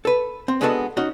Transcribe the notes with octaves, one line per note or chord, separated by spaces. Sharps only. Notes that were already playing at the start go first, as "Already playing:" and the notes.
A4 B4
C4
G#3 B3 D4 F#4 A4 D#5
C#4 D#4 F#4